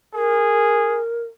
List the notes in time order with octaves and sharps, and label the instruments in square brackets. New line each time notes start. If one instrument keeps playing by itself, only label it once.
[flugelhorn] G#4 [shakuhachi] A#4